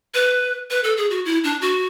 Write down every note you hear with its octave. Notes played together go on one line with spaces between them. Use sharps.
B4
B4
A4
G#4
F#4
E4
D4
F#4